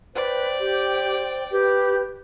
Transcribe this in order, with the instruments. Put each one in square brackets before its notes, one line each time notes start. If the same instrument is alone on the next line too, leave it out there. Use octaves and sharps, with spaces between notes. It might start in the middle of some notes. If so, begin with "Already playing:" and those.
[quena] B4 [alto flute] C5 [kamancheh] D5 G5
[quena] G4
[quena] G4 [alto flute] B4